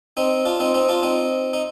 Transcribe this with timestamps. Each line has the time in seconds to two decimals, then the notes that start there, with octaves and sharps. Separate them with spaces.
0.17 C4 D#4
0.45 D4 F4
0.60 C4 D#4
0.74 C4 D#4
0.89 D4 F4
1.03 C4 D#4
1.53 D#4